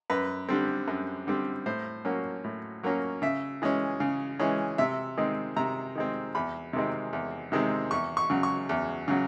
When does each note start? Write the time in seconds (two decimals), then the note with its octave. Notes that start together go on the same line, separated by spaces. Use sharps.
0.10 F#2 B4
0.48 D3 G3 C4
0.88 F#2
1.27 D3 G3 C4
1.66 A2 C5
2.05 F#3 A#3 C#4
2.44 A2
2.83 F#3 A#3 C#4
3.22 C#3 E5
3.62 E3 G#3 C#4
4.00 C#3
4.39 E3 G#3 C#4
4.78 C3 E5
5.18 D#3 G#3 C4
5.57 C3 A#5
5.95 D#3 G#3 C4
6.35 E2 B5
6.73 C3 D#3 G#3 C4
7.13 E2
7.52 C3 D#3 G#3 C4
7.91 E2 C#6
8.17 C#6
8.30 C#3 F#3
8.43 C#6
8.69 E2
9.08 C#3 F#3